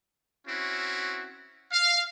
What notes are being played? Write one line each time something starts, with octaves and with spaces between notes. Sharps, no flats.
C4 C#4 E4 F#4
F5